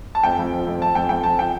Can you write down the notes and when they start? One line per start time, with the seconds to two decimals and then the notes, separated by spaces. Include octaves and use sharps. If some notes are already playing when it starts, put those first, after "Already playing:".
0.15 A5
0.24 F2 G5
0.39 F2
0.53 F3
0.67 F2
0.82 F2 A5
0.95 F2 G5
1.09 F2 G5
1.24 F2 A5
1.38 F3 G5